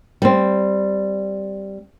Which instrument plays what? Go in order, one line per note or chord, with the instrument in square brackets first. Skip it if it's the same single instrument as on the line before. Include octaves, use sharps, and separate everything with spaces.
[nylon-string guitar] G3 C4